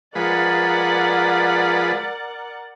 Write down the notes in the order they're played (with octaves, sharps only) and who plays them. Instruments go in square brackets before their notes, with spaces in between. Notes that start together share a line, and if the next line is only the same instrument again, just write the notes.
[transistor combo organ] F3 G#3 B4 [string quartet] A#4 D5 F#5